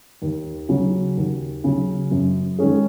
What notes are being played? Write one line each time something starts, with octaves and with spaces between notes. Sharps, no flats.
D#2
C#3 F#3
D#2
C#3 F#3
F#2
D#3 G#3 C#4 G#4